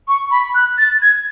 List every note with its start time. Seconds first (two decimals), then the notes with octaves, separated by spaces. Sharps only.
0.08 C#6
0.31 B5
0.55 F#6
0.78 A6
1.02 G#6